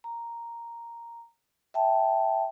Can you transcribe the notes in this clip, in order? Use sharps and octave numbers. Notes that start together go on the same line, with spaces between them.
A#5
E5 G5 A5